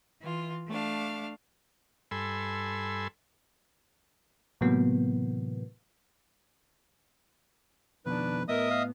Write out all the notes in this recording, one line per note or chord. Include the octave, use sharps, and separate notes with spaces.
E3 F4
A3 D4 F5
G2 A4 G#5 B5 C6 E6
A2 C3 E3 F#3 A#3 B3
F2 B2 D#3 D4 B4
A2 B3 A#4 D#5 E5 D#6
F5